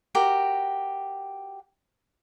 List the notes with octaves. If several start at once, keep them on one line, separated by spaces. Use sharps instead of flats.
F#4 G4 A#4